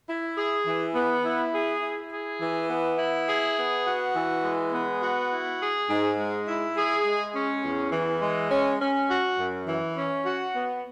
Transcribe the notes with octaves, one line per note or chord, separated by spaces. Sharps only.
E4
G#4
E3
B3
E4
G#4
E4
G#4
E3
B3
E4
G#4
B3
F#4
E3
G#3
B3
F#4
E4
G#4
G#2
G#3
E4
G#4
G#3
C#4
E2
E3
G#3
C#4
C#4
F#4
F#2
E3
C#4
F#4
B3